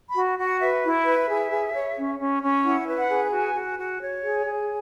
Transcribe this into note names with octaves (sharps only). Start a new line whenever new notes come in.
B5
F#4
F#4
F#5
B4 E5
E4
E5
B4
G#4
G#4
C#5
C#4
C#4
C#4
E4 F#5
B4
F#5
G#4
F#4 G#5
F#4
F#4
C#5
G#4
G#4